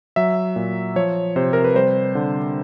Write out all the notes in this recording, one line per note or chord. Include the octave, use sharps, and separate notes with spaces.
F#3 E5
A#2
F3 C#5
C3 C5
A#4
B4
G3 C5
D3